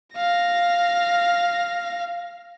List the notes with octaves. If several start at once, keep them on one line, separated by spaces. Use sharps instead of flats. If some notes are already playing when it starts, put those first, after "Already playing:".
F5 A#6